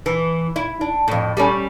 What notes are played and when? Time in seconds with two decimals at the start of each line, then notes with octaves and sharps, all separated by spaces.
0.06 E3
0.56 E4
0.81 D4
1.08 F2 A2
1.37 G3 A3 C#4